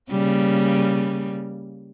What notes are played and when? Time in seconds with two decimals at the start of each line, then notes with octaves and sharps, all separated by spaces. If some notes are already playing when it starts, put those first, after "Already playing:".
0.11 C#3 G3 A#3